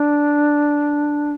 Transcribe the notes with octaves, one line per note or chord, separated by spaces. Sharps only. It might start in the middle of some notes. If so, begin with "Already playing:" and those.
Already playing: D4